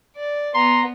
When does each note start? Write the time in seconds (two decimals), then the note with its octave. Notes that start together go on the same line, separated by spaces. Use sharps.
0.16 D5
0.55 B3 A#5 C6